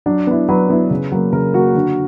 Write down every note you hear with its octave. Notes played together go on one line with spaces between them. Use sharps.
F#3 D4
B3 E4
F#3 B4
B3 E4
C#3
F#3 A#3
C#3 A#4
F#3 A#3 F#4
D3